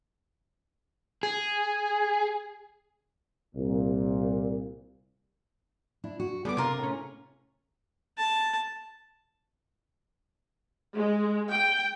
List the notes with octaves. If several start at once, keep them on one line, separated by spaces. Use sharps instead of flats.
G#4
C2 A#2
D4 E4
F#4
D3 G3 B3 G#4 D6
C3 F4 A#4
A2 C#4
A5
G#3
G5